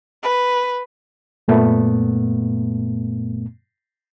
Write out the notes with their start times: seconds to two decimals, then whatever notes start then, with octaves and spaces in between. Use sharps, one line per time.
0.23 B4
1.48 F#2 A#2 A3 B3